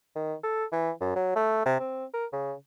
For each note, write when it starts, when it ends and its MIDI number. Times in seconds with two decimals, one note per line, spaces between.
0.16 0.34 51
0.43 0.65 69
0.72 0.91 52
1.01 1.14 42
1.15 1.32 54
1.35 1.61 57
1.65 1.77 48
1.80 2.05 60
2.13 2.26 70
2.33 2.54 49